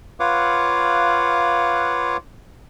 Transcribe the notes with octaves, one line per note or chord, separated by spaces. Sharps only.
F4 B4 C#5 F5 F#5 D6